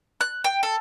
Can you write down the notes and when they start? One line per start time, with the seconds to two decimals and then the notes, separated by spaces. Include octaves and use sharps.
0.21 F#6
0.44 G5
0.63 A4